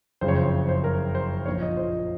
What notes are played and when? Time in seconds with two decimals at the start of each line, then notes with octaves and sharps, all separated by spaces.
0.21 F#1 F2 C#3 C5
0.28 C#5
0.36 C5
0.69 C5
0.84 A#4
1.15 C5
1.46 A#1 A#2 F3 C#5
1.61 D#5
1.77 C5